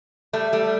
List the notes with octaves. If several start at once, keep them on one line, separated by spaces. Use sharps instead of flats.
G3 A3
G3 A3